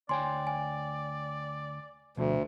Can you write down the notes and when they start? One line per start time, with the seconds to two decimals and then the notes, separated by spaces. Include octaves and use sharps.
0.09 D2 C#5 D5 G5 G#5 C6
0.47 G#5
2.17 D2 B2 F3